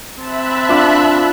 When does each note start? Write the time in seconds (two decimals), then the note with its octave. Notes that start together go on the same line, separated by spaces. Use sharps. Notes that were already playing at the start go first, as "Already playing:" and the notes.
0.21 C4 E5 A5 B5 F#6
0.69 D4 F4